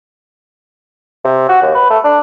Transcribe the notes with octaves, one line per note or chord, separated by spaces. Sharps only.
C3
F#4
D#2
B4
A3
D4